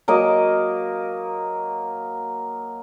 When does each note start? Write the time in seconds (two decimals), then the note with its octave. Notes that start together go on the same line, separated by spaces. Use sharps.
0.08 F#3 A#3 A#4 D#5